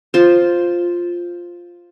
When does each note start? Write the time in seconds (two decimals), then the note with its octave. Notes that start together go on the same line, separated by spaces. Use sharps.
0.14 F4 C5